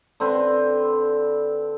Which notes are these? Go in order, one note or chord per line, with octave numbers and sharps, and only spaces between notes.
D3 C4 B4